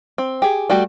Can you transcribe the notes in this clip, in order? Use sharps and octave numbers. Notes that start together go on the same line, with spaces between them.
C4
G4 G#4
G3 A3 F#4 G4